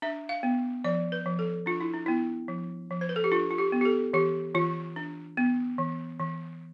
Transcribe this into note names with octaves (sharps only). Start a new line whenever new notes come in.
D4 E5
F5
B3
F3 D5
B4
F3
A4
D4 F4
E4
D4
B3 E4
F3
F3
C5
B4
A4
G4
D4 F4
F4
G4
B3
G4
A4
E3 G4
E3 F4
D4
B3
E3
E3